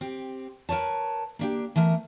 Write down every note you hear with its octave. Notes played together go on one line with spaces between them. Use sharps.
C4 G4
A#4 B4 C#5 A5
A#3 D4 G4
E3 A3 B3 A#4